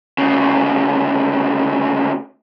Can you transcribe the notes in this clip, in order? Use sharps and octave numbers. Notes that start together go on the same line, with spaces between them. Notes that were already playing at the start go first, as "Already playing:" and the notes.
D2 C#3